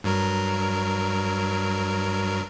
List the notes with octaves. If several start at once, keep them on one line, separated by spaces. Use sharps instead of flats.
G2 F#3 A#4